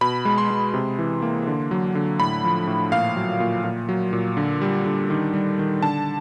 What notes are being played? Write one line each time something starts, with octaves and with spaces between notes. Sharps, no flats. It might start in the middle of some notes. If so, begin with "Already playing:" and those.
B2 B5
G#3
C6
G#3
C3
E3
A#3
D3
F#3
D3
A2 B5
F3
A2
A#2 F5
F#3
A#2
A#2
F#3
A#2
D3
G3
D3
D#3
G3
D#3
D3 A5